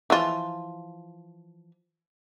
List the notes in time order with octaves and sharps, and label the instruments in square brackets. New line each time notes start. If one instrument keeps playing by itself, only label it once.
[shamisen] E3 F3 F4